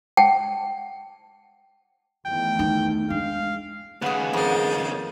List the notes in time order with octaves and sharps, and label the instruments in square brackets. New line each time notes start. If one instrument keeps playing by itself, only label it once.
[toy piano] F#5 G5 A5
[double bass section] E2 D#3 A3 [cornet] G5
[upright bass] D#4
[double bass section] G#3 [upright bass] D4 [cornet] F5
[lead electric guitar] D#2 C#3 [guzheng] G#4 B4 [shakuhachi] F#5
[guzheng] F2 A#3 [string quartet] G#4 G6 A6